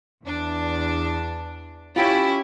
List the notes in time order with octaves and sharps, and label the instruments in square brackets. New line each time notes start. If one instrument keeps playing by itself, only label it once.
[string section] E2 D4
[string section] C#4 E4 [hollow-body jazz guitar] F4 G4